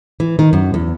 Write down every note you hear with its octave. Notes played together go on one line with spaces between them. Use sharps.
E3
D#3
F#2
E2